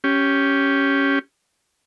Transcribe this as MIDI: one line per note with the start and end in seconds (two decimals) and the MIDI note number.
0.04 1.19 61
0.04 1.19 67